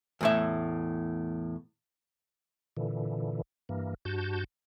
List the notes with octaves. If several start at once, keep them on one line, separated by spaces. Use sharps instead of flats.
E2 A2 E5
A#2 D3 E3
G2 E3 A#3
G2 F#4 A5 G6